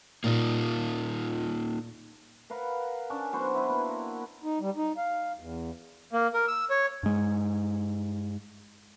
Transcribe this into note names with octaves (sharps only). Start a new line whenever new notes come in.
A#2 A#3 D#4 F4
A#4 B4 F5 F#5
C#4 D4
F#3 B3 F#4 C5
E4 B4
A#3
A#4
D#4
G3
D#4
F5
E2
A#3
A#4
E6
C#5
G2 G#3